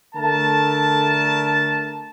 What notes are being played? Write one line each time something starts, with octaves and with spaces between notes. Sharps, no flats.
D3 A3 A#4 A5